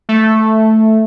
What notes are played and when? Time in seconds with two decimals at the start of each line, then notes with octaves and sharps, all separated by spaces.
0.09 A3